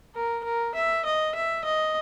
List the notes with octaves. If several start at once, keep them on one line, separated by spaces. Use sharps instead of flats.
A#4
A#4
E5
D#5
E5
D#5